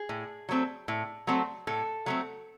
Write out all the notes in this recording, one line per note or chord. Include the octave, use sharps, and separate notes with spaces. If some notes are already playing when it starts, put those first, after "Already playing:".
Already playing: G#4
A2
F#3 A3 C4
A2
F#3 A3 C4
A2 A4
F#3 A3 C4